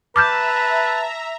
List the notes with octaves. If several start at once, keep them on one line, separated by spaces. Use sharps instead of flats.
B4 E5 A5 A#5 D6 F6 G6